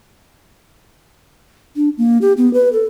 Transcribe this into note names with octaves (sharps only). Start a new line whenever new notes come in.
D4
A#3
G4
B3
B4
A4